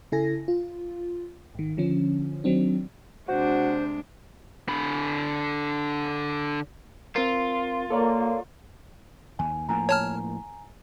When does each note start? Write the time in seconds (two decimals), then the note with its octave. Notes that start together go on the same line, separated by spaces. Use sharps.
0.12 C#3 E4 A4 G#5 A#6
0.48 F4
1.55 G#1 D#3
1.77 D3 F3 C#4
2.44 D#3 F#3 C4 D4
3.28 C3 G#3 D4 F#4 C5
4.68 D3 B5
7.16 C4 F4 A#4
7.90 A#3 A4 C#5 D5
9.39 D#2 G#5
9.69 A2 F3 A#3 G#5 A#5
9.89 C#5 A5 F6